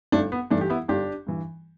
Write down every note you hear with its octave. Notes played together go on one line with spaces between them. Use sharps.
G1 A3 D4
B3
G2 E3 A3 D4
G4
B3 E4
G1 D4 G4
G2 E3